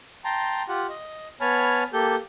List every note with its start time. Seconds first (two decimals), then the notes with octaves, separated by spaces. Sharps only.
0.25 G5 A5 A#5 C6
0.69 F4 G4 F#5
0.89 D#5
1.41 B3 C#5 G#5 A5 B5 F6
1.93 A#3 G4 A4 G6